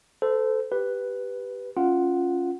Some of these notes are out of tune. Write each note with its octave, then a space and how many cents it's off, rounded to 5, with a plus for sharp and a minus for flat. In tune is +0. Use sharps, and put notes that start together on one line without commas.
A4 +0 C5 -30
G4 +0 B4 +0
C#4 +0 F4 +0 F#5 +0